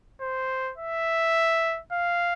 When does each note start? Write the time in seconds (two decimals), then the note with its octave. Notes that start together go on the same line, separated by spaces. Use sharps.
0.21 C5
0.77 E5
1.92 F5